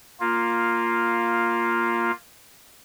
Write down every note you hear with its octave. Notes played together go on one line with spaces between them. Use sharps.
A#3 F4